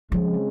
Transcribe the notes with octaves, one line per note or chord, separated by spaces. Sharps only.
C#3 F3 G#3 C4